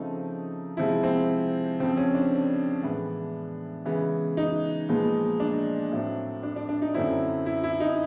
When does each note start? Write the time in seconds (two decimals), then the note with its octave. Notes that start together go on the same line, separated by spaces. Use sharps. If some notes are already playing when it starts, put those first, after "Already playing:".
Already playing: C#3 F3 A3 C4 D#4
0.77 C3 F3 G#3 E4
1.03 C4
1.80 F2 C#3 F3 C4
1.97 C#4
2.14 D4
2.83 A2 E3 G#3 B3
3.85 C#3 E3 G#3 B3
4.37 D#4
4.89 A#2 F3 G#3 B3
5.40 D4
5.91 A2 F#3 A3 C4
6.43 D4
6.56 D4
6.69 D4
6.82 D#4
6.94 F#2 D3 F#3 A3 C4 E4
7.46 E4
7.64 E4
7.80 D#4